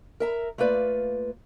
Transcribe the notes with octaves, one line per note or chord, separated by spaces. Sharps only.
A#4 E5 A#5
A3 A#3 F4 B4 D5